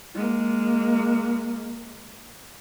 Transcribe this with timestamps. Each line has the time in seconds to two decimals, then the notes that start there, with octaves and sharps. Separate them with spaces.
0.15 G#3 A#3